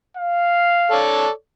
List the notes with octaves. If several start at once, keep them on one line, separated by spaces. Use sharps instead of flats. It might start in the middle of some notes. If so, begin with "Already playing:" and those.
F5
A4 C#5 D5